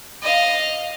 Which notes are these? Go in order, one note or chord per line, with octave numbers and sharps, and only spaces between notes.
D#5 F5